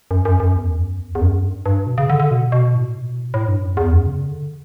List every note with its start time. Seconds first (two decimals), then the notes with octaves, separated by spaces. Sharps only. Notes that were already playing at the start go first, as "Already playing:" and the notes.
0.11 F#2
0.25 F#2
0.40 F#2
0.56 E2
0.77 F#2
1.00 E2
1.15 E2
1.21 F#2
1.43 G2
1.66 G2
1.87 B2
1.98 C#3
2.10 D3
2.20 D3
2.31 B2
2.52 B2
2.75 A2
2.97 B2
3.34 A2
3.48 G2
3.62 F#2
3.77 E2
3.92 F#2
4.07 C#3
4.28 D3